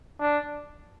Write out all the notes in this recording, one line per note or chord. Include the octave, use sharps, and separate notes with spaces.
D4